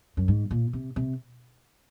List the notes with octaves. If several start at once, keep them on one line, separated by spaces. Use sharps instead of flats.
F#2
G#2
A#2
C3
C3